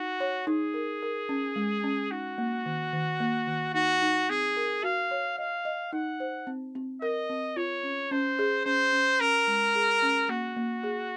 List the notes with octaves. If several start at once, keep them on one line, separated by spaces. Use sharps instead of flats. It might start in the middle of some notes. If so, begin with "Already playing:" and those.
Already playing: D#4 F#4
C#5
D#4 G#4
A#4
A#4
C#4
G#3
C#4
D#4 F#4
A#3
D#3
D#3
A#3
D#3
D#4 F#4
D#4
C4 G#4
A#4
F#4 F5
C#5
D#5 F5
D#5
D#4 F#5
C5
C4
C4
A#4 D#5
C4
F4 C#5
C#4
C#4 C5
G#4
C#4 C5
C#4
C#4 A#4
G#3
G#4
C#4
A#3 F#4
A#3
G#4